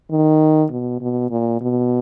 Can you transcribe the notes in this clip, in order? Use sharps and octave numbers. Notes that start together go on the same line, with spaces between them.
D#3
B2
B2
A#2
B2